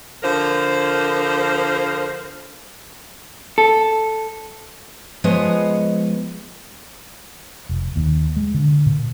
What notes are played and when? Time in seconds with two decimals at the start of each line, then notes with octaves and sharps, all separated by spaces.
0.23 D3 F3 A#4 C5
3.58 A4
5.24 F3 G#3 B3 C#5 D#5
7.69 F1
7.96 D#2
8.37 G#3
8.54 D3
8.86 A#2